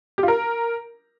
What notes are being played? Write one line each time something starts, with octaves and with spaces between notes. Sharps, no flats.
G4
F4
A#4